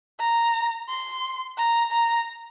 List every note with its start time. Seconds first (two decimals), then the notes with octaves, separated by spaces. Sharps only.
0.20 A#5
0.89 C6
1.58 A#5
1.92 A#5